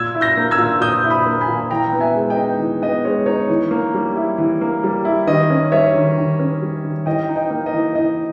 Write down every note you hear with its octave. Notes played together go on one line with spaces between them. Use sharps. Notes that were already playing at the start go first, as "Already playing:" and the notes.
Already playing: A#2 E6 G#6
E4
G6 A#6
A#3
E6 G#6
A#2
A#2 D#6 G6
E4
B5 D#6
A#3
G#5 B5
A#2
E3 G5 A#5
B3
E5 G#5
G#3
D#5 G5
D#4
E3
B3 D#5
G#3 C#5
D#4 C#5
E3
A#3
G3
E4
E3
A#3
G3
E4
D#3 D#5
C#4
G3 C#5 E5
D#3
D#3
C#4
G3
D#3
E3 D#5 G5
D#4
D#5 G5
A#3
D#5
E3
E3 D#5